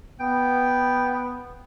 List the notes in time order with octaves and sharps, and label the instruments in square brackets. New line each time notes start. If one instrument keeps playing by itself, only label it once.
[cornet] B3 [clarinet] G5